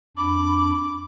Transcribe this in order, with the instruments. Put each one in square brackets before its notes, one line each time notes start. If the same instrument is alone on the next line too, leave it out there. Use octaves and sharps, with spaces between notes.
[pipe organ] F2 D4 B5 [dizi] D6